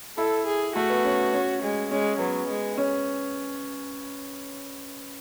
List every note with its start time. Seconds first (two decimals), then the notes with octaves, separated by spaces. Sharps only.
0.17 E4 A4
0.46 G#4
0.75 A3 F#4
0.90 B3
1.05 C#4
1.34 C#4
1.62 G#3
1.91 G#3 C#4
2.19 F#3 B3
2.49 G#3
2.78 C#4